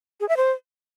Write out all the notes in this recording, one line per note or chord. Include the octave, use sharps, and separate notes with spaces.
G#4
E5
C5